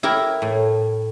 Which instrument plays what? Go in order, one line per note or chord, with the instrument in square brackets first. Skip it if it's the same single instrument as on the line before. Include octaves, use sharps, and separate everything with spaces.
[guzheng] E4 G4 A#4
A2